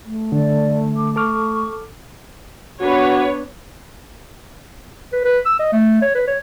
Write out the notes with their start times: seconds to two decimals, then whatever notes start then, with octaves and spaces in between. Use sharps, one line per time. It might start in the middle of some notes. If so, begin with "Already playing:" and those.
0.05 A3
0.32 D3 D5
0.96 D6
1.16 A4 C#6 D6 F6
2.81 B3 D4 F#4 B4 C#5
5.12 B4
5.25 B4
5.45 E6
5.59 D#5
5.72 A3
6.02 C#5
6.15 B4
6.27 C#5